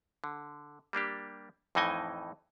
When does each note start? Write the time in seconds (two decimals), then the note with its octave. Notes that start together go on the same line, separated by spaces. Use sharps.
0.24 D3
0.93 G3 A#3 D4 G4
1.75 F2 A2 E3 D#4 D#5 G#5